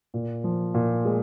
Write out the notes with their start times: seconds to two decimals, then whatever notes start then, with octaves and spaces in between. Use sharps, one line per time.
0.14 A#2
0.44 F3
0.74 A#2
1.05 G#3